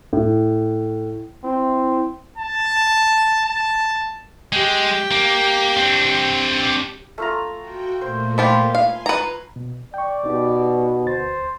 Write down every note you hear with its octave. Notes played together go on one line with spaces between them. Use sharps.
A2
C4 E4
A5
A5
G#3 G4 G5
A#3
C4 D4
A3 F4 A#5
F#4 G5
A#2 A3 A#3 C5
F3 F4 G4 B5
F5 G#5 C6
B4 A#5
B2
D5 G5 C#6
B2 D#4 G4
D2 C5 A6